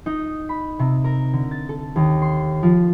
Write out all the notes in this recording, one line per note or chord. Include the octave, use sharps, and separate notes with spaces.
D#4
B5
C3
A#4
D3
A6
A4
D#2
C6
F3